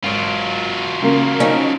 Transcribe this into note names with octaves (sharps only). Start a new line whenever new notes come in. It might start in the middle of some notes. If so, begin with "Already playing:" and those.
G#1 F#3 F4 D7
C#3 A#3
C#4 D#4